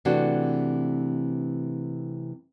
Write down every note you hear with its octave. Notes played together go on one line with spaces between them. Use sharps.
C3 E3 A3 D4 F#4